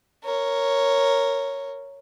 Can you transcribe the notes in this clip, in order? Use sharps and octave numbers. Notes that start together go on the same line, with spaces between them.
A#4 C#5